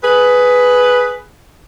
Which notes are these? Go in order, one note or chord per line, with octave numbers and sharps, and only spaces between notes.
G#4 B4